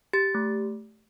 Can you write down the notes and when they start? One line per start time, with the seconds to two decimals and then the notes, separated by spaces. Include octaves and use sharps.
0.13 G4 A6
0.35 A3